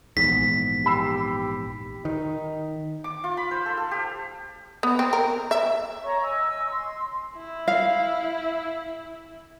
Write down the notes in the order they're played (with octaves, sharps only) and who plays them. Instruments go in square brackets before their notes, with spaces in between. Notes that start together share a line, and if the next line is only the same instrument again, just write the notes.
[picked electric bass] A#1 E2 G#2 [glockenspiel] B6
[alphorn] G4 [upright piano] B5 E6 C7
[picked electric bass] D#3 [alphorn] D#4
[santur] D6
F4
B5
C5
A4
A4
G4
[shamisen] B3
C4
A#4
E5
[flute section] C#5 A#5 C#6
D#5 G#5 C#6 E6
C6
[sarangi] E4
[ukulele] F5